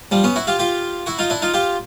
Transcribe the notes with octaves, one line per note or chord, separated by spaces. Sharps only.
F3 G3
B3 C#4
E4 F#4
F4 G4
F4 G4
E4 F#4
D#4 F4
D4 E4
D#4 F4
F4 G4